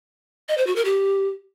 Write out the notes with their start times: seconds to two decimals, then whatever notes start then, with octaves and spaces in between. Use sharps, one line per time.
0.49 D#5
0.58 C5
0.67 F#4
0.76 A#4
0.85 G4